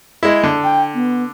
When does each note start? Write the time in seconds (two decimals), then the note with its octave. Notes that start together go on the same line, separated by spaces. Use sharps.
0.23 G#3 E4
0.43 D3
0.64 G5
0.94 B3